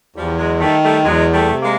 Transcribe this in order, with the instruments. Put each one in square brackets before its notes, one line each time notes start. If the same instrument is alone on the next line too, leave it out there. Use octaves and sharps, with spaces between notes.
[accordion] E2 [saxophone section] F3 G3
[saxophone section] F#3 G#3
[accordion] D#3 [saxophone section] G3 A3
[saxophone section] G3 A3
[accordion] E2 [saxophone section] F#3 G#3
[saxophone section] G3 A3
[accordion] C3
[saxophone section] G#3 A#3